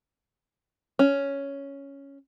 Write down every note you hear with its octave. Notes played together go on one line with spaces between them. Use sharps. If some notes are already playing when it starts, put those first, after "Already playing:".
C#4